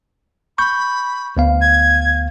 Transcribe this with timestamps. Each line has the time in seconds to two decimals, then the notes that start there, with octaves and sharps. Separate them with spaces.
0.58 B5 C#6 G6
1.37 D2 B3 F5
1.61 G#6